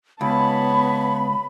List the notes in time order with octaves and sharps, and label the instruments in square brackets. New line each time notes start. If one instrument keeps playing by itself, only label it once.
[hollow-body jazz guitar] C#2 [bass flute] B3 [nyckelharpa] C#5 A5 [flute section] B5